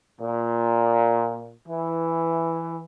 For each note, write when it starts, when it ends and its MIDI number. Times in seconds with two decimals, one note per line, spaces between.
0.19 1.51 46
1.67 2.82 52